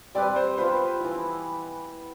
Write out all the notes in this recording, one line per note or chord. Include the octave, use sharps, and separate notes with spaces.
G3 C4 G4 B4 D5
C5
F3 B3 F4 B4 C5
E3 B3 E4